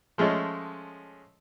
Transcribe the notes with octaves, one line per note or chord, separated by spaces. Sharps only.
F3 G#3 A3 C#4 D#5